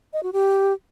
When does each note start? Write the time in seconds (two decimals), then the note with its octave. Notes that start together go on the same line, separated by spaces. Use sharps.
0.13 D#5
0.23 F#4
0.33 G4